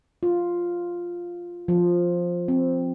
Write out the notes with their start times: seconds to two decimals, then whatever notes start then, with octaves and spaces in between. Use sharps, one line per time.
0.23 F4
1.68 F3
2.48 C4